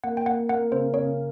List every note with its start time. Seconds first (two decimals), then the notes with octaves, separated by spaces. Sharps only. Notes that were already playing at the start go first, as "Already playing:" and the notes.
0.03 A#3 F#5
0.17 G5
0.26 A#3 F#5
0.49 A#3 F#5
0.72 C#3 C5
0.94 C#3 C#5